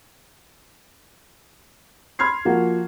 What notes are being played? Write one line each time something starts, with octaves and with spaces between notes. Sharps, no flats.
B5 C6 F6 G#6 C7
F3 A#3 F#4